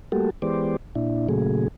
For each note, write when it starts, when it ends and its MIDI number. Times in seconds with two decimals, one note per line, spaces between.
0.12 0.30 55
0.12 0.30 57
0.12 0.30 58
0.12 0.30 66
0.12 0.30 67
0.12 0.30 69
0.42 0.76 52
0.42 0.76 56
0.42 0.76 59
0.42 0.76 67
0.42 0.76 72
0.42 0.76 74
0.95 1.28 46
0.95 1.28 62
0.95 1.28 64
1.29 1.68 46
1.29 1.68 49
1.29 1.68 54
1.29 1.68 57
1.29 1.68 68